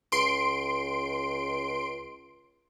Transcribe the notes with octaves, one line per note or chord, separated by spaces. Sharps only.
C#2 C6 D7